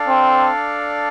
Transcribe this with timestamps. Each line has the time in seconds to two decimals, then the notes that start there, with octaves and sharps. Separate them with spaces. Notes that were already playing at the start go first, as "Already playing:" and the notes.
Already playing: D4 A4 D5 F5
0.09 C4